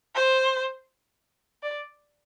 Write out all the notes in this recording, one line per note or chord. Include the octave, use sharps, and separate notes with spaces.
C5
D5